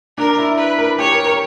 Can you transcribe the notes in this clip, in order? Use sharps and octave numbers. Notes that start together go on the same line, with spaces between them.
D4 A#4
E4
B4
A#4
G4 C#5
A#4
A#4